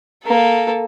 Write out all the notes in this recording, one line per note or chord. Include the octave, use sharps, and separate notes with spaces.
A#3 A4